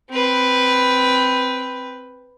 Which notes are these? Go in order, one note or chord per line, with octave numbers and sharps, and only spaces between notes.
C4 B4